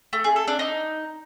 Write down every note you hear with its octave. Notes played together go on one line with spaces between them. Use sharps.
A3
G#4
A4
D4
D#4